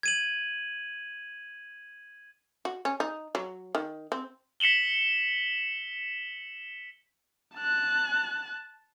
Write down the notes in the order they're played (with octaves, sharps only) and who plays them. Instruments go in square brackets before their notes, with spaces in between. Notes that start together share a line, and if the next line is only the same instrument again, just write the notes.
[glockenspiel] G#6 D#7 F#7
[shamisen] F#4
C#4
D#4
F#3
D#3
C4
[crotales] B6 C#7 E7 F#7 G7
[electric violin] A5 F#6